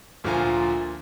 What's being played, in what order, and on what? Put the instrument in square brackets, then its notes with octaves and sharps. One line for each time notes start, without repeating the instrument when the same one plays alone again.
[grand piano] D2 A#2 F3 F4 G#5 A#5